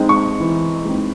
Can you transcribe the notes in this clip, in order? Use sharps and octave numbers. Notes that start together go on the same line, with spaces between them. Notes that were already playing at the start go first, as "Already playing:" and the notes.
Already playing: G#3 C4 D#4
C#6
E3
G#3 C4 D#4